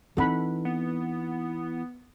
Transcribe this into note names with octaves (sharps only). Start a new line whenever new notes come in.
E3 C4 D#4 A4 F#5 B5
B3